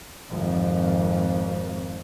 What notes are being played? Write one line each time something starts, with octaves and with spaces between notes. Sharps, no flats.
G#1 F2